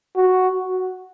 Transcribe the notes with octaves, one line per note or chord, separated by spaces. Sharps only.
F#4